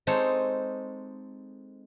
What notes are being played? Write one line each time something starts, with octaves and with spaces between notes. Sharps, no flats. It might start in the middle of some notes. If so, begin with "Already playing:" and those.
G#3 C4 D#4 A4 C5 C#5